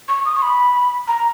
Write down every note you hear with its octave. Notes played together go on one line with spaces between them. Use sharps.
C#6
D#6
C#6
B5
A#5